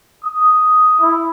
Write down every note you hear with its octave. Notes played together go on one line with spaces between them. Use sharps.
D#6
E4